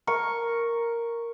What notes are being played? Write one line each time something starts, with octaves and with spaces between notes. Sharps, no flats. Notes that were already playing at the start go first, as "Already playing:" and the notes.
A#4 C#6